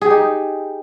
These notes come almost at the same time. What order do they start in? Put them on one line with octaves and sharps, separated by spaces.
G#4 G4 D#4